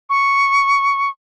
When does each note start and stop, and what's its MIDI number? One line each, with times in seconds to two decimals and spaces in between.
0.10 1.09 85